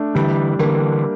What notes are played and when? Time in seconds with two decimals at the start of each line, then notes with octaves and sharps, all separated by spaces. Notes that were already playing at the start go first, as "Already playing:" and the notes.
Already playing: A3 D4
0.15 D3 E3 G3
0.59 D3 E3 A#3